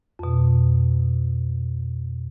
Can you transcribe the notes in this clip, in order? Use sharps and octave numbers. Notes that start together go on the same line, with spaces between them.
F2 B2